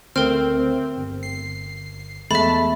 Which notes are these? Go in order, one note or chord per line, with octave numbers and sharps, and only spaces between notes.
D2 A3 C4 A#4 G5 F6
G1
C7
E2 G#3 A3 E5 A5 B5